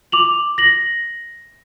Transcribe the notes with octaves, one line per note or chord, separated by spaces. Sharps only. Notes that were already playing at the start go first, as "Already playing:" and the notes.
D6 F7 F#7
A#6 F#7